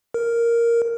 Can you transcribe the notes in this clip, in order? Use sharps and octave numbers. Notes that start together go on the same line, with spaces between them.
A#4